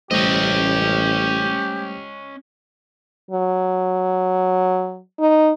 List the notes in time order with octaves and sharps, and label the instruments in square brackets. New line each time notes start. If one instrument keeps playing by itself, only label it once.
[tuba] A1 [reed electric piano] G3 A3 C5 [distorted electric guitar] C#4 D#5 [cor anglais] G4
[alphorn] F#3
D#4